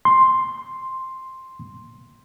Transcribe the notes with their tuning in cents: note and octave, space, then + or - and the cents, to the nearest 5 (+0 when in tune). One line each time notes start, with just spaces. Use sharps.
C6 +5